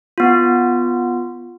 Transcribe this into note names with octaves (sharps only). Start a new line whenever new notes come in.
B3 F4